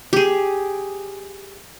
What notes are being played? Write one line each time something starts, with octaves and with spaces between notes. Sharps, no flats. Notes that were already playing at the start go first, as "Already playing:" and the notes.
G4 G#4